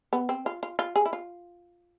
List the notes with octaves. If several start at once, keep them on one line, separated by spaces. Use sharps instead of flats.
B3
C4
F4
F4
F4
G#4
E4
F4